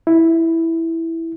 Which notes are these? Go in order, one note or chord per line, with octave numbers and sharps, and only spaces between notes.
E4